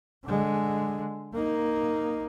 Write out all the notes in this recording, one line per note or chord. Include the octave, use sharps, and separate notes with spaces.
D3 G#3
A#3 D#4